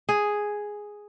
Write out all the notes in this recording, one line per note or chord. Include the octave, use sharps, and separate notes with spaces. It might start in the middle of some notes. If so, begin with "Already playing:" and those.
G#4